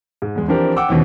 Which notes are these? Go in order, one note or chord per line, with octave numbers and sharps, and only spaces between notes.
G#2
E2 G#3
E3 F3 C4 D4 G4 A#4
F#5 G5 D6 E6
D#2 B2 D#3 E3 C4 C#4